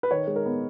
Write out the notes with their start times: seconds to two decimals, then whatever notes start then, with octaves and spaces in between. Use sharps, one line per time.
0.03 B4
0.11 D#3 C#5
0.27 G#3
0.36 A#4
0.45 B3